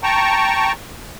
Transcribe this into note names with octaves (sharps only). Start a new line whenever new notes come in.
G5 A5 A#5 C#6